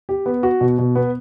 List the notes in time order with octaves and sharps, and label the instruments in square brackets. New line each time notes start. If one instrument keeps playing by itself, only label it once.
[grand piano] G4
B3
F#4
B2
B2
B3